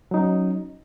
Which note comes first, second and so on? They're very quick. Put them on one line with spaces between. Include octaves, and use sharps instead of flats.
F#3 D#4 C#4